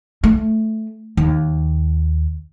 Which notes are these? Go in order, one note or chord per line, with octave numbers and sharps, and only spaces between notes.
A3
D#2